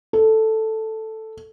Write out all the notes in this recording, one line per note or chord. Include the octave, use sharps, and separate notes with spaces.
A4